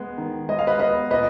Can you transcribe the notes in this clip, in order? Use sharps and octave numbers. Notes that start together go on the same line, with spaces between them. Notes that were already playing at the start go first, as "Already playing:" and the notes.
Already playing: G#3 B3
D#3
G#3 D#5
F5
B4 D#5
B3 B4 D#5
A#2 B4 D#5